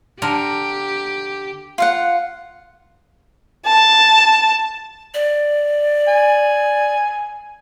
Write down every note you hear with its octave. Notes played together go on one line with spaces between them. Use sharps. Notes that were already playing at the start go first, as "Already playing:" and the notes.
D3 G4 A#4
F4 F5 F#5
A5
D5
G#5